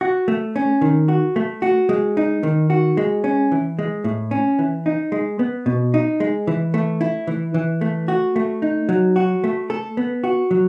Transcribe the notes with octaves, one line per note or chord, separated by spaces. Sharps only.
F#4
A3
C#4
D#3
F#4
A3
F#4
G#3
D#4
D#3
F#4
G#3
C#4
E3
G#3
A2
C#4
E3
D#4
G#3
B3
B2
D#4
G#3
E3
A3
E4
E3
E3
A3
F#4
A3
D#4
F#3
F#4
A3
A4
B3
F#4
F#3